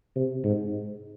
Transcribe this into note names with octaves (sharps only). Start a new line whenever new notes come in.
C3
G#2